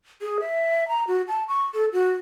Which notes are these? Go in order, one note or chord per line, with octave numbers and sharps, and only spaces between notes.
G#4
E5
A#5
F#4
A5
C#6
A4
F#4